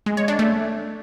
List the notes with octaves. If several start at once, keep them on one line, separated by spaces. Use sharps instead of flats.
G#3
C#5
D4
A3